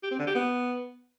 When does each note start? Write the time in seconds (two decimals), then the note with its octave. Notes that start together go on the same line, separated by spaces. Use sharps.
0.03 G4
0.11 C4
0.19 D3
0.27 G4
0.35 B3